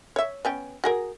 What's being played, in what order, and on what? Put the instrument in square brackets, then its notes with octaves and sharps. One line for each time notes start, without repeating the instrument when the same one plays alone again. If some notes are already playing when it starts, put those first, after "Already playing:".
[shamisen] C#5 E5
B3 C#4 G5
F#4 G#4 A#4